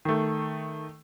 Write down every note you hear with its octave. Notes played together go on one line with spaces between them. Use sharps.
D#3 A3